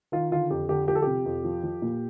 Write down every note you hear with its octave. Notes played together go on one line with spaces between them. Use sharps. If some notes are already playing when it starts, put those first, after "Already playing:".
D#3 F4
D3 F4
F2 G4
D3 G4
F3 G4
A4
C3 G4
F2
F3
F3
A#2